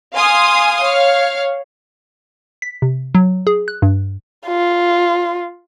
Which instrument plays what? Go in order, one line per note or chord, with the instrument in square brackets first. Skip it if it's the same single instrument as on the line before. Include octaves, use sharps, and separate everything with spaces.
[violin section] F5 G#5 C6 D#6
C#5 F5
[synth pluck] B6
C3
F#3
G#4
F#6
G2
[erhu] F4